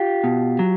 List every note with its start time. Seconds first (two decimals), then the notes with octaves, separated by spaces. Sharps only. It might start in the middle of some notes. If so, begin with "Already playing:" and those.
Already playing: F4 G4
0.24 B2
0.59 F#3